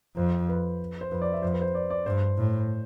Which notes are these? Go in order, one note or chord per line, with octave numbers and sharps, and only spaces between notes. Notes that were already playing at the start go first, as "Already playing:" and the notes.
F2 C5
B4
C5
F2 B4
D5
E5
F2 C5
B4
C5
D5
D5
G2 C5
A2